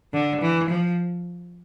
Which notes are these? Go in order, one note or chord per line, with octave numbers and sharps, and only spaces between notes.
D3
E3
F3